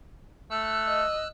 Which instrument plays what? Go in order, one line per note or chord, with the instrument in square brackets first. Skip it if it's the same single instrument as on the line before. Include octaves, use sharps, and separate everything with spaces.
[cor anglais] A3 [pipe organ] E6 F#6
[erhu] D#5